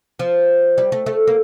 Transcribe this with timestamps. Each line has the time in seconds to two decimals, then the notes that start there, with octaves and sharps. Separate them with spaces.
0.19 F3
0.78 G3
0.92 A3
1.06 A3
1.28 A#3